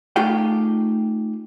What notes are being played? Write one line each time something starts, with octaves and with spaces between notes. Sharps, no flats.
A3 D#4 F4 G4 G#4 G5